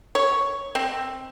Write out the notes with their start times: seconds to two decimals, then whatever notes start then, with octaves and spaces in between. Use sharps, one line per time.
0.15 C#5
0.75 C4